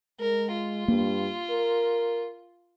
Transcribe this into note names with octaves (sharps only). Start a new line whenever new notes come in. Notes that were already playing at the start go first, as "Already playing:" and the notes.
G#3 A#4
F4
G2 A#3
A#4